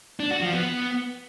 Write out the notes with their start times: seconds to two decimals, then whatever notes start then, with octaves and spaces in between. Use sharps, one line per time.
0.20 D4
0.31 F#4
0.42 F3
0.53 B3